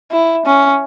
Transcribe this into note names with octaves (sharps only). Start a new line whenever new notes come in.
E4
C#4